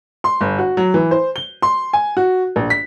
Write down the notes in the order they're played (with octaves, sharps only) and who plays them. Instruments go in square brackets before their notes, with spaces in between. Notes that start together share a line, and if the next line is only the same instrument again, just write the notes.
[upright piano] C6
G1
F#4
F#3
E3
C5
G7
C6
G#5
F#4
A#1
B6